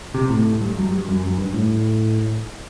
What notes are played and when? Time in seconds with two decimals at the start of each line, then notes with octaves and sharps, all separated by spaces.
0.14 C3
0.29 A2
0.61 G2
0.76 F#2
0.91 G2
1.07 F#2
1.23 F#2
1.37 G2
1.54 A2